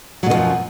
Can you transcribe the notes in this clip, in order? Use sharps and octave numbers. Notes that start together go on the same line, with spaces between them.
F#2 B2 D#3 F3 F#3